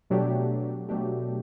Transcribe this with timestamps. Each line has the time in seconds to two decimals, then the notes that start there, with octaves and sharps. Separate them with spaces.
0.10 B2 F#3 A3 D4 G4
0.89 B2 F#3 A3 D4 G4